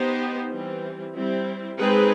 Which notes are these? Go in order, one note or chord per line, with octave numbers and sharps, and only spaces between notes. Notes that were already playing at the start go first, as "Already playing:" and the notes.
Already playing: B3 D#4 G4 C5
E3 G3 C4
G3 C4 E4
G#3 C4 D#4 G#4 B4